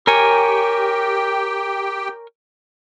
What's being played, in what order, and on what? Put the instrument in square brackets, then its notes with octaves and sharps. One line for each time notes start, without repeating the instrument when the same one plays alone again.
[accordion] G4 G5 [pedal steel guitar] A#4 C#5 G#5